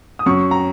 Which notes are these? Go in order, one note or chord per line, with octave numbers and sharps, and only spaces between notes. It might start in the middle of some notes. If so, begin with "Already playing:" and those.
D#6
F#2 C#6
A#5